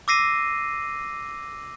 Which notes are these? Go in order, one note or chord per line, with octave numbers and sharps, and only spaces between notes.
D6 E6 A#6 C7 D#7